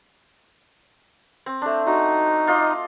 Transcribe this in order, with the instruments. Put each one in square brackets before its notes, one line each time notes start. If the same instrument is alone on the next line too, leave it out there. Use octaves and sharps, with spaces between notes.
[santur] C4
A3 D4
[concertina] D#4 [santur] F#4
[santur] F4 D#5 D6